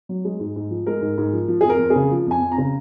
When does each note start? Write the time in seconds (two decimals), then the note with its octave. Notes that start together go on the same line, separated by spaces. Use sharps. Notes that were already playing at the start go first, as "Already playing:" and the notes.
0.09 F#3
0.25 G#3
0.40 G#2
0.56 G#2
0.71 F3
0.87 G#3 A#4
1.01 G#2
1.18 G#2
1.33 F3
1.48 F3
1.61 G#4
1.65 F2 A#4
1.79 F2
1.90 G#4
1.96 C#3
2.11 F3
2.27 F2 G#5
2.41 F2
2.52 A#5
2.58 C#3